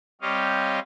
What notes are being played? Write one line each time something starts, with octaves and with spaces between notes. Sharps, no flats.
G3 C4 G4 C#5 D#5 F5